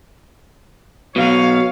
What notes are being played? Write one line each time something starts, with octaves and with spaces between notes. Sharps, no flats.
B2 F#3 C#5 F5